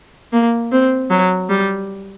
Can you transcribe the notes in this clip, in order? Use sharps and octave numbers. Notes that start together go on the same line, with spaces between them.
A#3
C4
F#3
G3